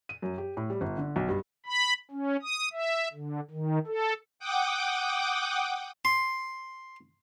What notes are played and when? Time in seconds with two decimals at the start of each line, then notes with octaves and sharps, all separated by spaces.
0.09 D#7
0.22 F#2
0.38 G4
0.57 A2
0.70 G3
0.81 G1
0.98 D3
1.16 B1
1.29 G2
1.66 B5
2.11 C#4
2.42 D#6
2.73 E5
3.13 D3
3.51 D#3
3.87 A4
4.39 F#5 G5 D6 D#6
6.05 C6